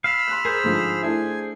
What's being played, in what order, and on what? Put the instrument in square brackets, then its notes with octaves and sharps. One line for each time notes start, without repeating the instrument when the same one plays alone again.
[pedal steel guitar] F5 [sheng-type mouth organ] B5 E6 F6
[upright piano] C6 F#6
[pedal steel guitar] G#4 C5 [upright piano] A#4
[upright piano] G#2 D3 F3
[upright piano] A3 D4 E4 [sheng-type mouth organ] G#5